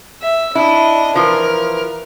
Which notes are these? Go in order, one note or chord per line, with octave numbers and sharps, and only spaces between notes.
E5
D4 E4 D#5
E3 F3 A#4